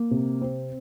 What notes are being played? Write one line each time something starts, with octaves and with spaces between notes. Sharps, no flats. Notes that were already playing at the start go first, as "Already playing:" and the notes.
Already playing: A#3
C3
C4